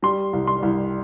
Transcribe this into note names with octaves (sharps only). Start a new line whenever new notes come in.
G3 C6
C2
C6
C2